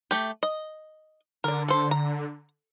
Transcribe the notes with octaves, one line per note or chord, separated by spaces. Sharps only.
A3 G4
D#5
D3 A#4 D5
A4 C5
A#5